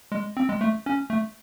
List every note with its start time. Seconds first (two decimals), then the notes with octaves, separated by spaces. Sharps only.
0.12 G#3
0.37 C4
0.49 G#3
0.61 A3
0.86 C#4
1.10 A3